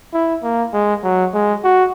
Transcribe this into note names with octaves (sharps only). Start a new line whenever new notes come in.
E4
A#3
G#3
F#3
G#3
F#4